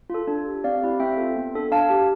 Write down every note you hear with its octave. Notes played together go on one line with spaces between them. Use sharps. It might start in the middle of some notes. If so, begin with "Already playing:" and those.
F4 A4
D4
G4
C4 D5 F5
E4 G4
C4 E5 G5
F4 A4
B3
D4 A4
D4 F5 A5
G4